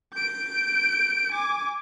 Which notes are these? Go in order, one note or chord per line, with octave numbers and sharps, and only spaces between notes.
G6 D7
G#5 D6